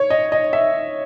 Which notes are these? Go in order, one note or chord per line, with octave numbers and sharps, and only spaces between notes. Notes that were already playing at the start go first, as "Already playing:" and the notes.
Already playing: C#5
D#5
D#5
E5